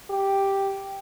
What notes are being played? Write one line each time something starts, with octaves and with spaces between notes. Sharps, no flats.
G4